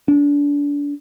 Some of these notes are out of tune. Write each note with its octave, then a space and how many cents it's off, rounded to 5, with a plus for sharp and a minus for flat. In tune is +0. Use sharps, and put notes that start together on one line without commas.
D4 -30